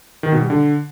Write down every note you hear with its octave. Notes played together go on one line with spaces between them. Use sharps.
D#3
B2
G3
D3